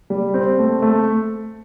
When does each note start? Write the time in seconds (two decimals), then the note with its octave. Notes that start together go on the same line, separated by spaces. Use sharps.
0.10 G3
0.34 C4
0.59 A3
0.82 A3